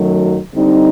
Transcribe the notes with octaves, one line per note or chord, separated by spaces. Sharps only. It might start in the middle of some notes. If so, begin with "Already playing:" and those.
Already playing: F#2 D#3 F#3 A3
D3 G3 C4 D#4